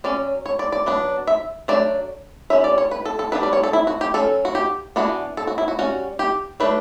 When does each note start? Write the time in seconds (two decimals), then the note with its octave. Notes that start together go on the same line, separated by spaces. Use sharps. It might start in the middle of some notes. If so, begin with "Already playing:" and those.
0.04 F#3 C#4 D5
0.46 C#5
0.59 D5
0.72 D5
0.86 F#3 B3 D4
1.27 E5
1.68 F#3 A3 D4 D5
2.50 G3 C#4 E5
2.64 D5
2.78 C#5
2.91 B4
3.05 A4
3.19 A4
3.32 G3 B3 D4 B4
3.43 D5
3.53 C#5
3.63 A4
3.73 E4
3.87 F#4
4.01 G4
4.14 F#3 C#4 A4
4.45 F#4
4.55 G4
4.96 E3 B3 D4 F#4
5.37 A4
5.47 F#4
5.58 E4
5.68 F#4
5.79 G3 C#4 F#4
6.19 G4
6.60 F#3 A3 D4 B4